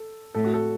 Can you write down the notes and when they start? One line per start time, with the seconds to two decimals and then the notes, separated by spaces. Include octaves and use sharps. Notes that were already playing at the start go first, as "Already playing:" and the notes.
Already playing: A4
0.34 A2 A4
0.44 F#4
0.54 A4